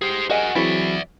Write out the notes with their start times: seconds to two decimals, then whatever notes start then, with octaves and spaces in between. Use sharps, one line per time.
0.02 G4 G#4 C5
0.30 F#4 G#4 A#4 D#5 G#5
0.55 E3 F#3 C4 E4 F#4 G#4 D5 E5